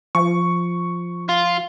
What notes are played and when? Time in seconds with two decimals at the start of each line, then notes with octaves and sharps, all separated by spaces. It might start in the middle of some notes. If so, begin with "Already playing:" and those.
0.15 F3 C#6
1.29 F4